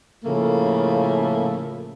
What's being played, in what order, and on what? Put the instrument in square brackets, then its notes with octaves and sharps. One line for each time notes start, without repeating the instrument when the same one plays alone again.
[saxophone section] A2 C#3 F3 A3 A#3